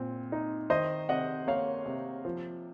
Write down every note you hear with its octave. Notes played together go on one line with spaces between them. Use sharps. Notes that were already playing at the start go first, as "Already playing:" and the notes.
Already playing: A#2 C4
D#4
D#3 C5 D#5
C3 D#5 F#5
A#3 C#5 F5
C3
F3